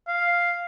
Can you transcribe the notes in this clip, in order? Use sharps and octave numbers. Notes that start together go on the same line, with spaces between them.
F5